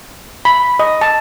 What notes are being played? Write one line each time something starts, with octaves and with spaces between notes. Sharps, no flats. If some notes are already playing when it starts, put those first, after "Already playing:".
B5
D#5
A5